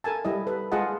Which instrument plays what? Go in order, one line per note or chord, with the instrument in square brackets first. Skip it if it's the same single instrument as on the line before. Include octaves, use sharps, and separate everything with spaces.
[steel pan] A4 A#4 G#5 A5
G3 E4 D#5
A4 B4
G#3 F4 G#4 D#5 F#5 A5